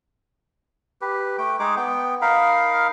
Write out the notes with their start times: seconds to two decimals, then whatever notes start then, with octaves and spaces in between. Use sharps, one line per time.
1.01 G4 B4
1.38 A3 G5
1.59 G#3 D#4 G#4 D6
1.77 B3 G5
2.22 D#4 A#4 F5 B5